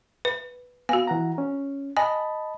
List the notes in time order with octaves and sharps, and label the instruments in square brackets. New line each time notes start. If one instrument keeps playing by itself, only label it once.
[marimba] B4
[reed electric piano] B3 F5 [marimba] F#4 G#5
[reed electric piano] E3 F#5 A#5
C#4
[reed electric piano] D#5 A5 B5 [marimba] G#5